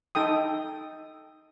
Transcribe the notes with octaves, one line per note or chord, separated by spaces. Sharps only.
D#4 A4 G5 D#6